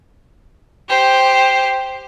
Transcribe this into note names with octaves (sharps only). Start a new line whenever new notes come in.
G4 C5